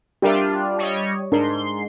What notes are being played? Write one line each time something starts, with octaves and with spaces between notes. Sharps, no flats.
G3 D4 F4 G4 A#4 E5
G3 C#5 D#5
G#2 D4 A#4 C6